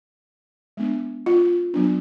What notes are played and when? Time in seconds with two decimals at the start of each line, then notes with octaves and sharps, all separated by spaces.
0.77 G#3 B3 D4
1.26 F4
1.74 F#3 B3 D4